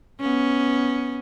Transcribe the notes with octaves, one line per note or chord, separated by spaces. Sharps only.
B3 C#4